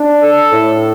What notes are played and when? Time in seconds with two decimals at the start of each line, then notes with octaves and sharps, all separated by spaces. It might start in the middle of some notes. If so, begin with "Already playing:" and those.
Already playing: D4
0.22 A4
0.52 A2